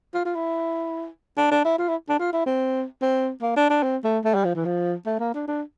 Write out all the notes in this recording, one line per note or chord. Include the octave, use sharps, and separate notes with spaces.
F4
F4
E4
D4
D4
E4
F4
E4
D4
F4
E4
C4
C4
A#3
D4
D4
C4
A3
A3
G3
F3
E3
F3
A3
A#3
D4
D4